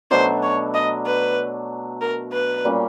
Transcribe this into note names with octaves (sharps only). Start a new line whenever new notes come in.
B2 F#3 A3 D4 C5
C#5
D#5
B4
A#4
B4
A#2 G3 A#3 C#4